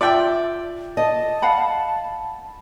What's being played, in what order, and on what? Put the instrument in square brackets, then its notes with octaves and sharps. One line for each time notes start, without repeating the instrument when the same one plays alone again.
[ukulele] F4 [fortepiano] D5 E5 G5
[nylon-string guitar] D#5 [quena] A5
[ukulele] F5 F#5 B5